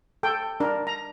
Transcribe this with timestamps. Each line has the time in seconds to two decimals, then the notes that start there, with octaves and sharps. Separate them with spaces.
0.23 A4 G5
0.60 D4 A#4
0.87 A#5